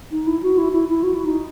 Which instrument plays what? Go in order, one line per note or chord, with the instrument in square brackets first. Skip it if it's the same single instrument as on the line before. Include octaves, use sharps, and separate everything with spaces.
[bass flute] D#4
E4
F#4
E4
E4
E4
F#4
E4
D#4